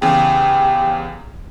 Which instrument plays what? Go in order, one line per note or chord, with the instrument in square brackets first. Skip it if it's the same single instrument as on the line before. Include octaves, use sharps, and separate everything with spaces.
[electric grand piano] E2 C#3 [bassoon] G4